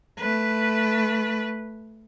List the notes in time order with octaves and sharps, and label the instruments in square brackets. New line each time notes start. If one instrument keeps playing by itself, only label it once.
[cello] A3 B4